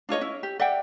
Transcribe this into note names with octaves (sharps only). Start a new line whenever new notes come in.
D4 F4 C#5 D#5
C#4 E4
G4
D5 E5 F#5 G5